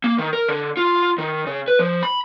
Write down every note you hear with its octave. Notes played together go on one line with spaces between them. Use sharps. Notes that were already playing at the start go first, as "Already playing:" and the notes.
A#3
D#3
A#4
D3
F4
D#3
C#3
B4
F3
B5